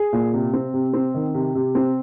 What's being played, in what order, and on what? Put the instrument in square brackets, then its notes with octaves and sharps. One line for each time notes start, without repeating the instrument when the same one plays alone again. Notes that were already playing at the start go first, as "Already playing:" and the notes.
Already playing: [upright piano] G#4
A#2
C3
C4
C3
C4
D#3
C3
C3
C4